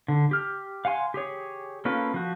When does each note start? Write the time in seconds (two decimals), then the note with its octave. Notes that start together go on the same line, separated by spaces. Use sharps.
0.08 D3
0.31 G4 F6
0.85 F5 F#5 G#5 C6
1.14 G4 G#4 C#5
1.85 A#3 C#4 F4 A4 B4
2.14 F3 F#4